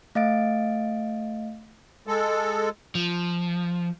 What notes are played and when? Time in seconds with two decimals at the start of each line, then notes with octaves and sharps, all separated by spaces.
0.15 A3 D#5 F5 A6 D7
2.07 G#3 A4
2.95 F3